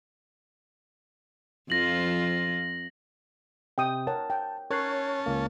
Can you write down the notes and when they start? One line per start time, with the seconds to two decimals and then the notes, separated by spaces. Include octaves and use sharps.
1.70 F2 F3 F4 A#6 F#7
3.78 C3 G5 D#6
4.07 A#4 C#5 F#5 A5
4.30 G5
4.71 C#4 A#4 C#5 A5 F#6 C7
5.26 C#2 A#3